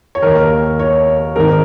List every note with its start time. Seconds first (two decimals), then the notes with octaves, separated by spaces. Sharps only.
0.15 C#5
0.22 D#2 D#3 A#4
0.79 C#5
1.36 G#1 G#2 D#3 A#4